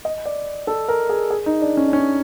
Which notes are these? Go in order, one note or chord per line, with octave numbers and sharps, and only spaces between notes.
D#5
D5
A4
A#4
G#4
G#4
D#4
D4
C#4
D4
C#4